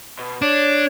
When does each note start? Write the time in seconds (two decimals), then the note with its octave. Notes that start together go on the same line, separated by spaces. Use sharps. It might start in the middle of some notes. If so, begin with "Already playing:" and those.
0.19 B2
0.42 D4 C#5